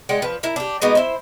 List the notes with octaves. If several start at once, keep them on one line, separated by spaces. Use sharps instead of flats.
G#3 D5 F#5 G5
F3 B4
E4 A#4
D4 G4
G#3 B3 D#4 F#4
E4 C5